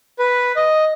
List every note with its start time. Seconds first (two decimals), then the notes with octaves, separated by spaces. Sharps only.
0.19 B4
0.56 D#5